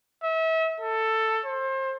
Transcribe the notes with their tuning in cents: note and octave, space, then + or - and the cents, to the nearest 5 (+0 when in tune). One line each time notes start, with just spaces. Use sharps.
E5 -35
A4 +10
C5 +30